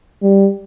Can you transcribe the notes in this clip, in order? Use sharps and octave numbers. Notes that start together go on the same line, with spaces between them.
G3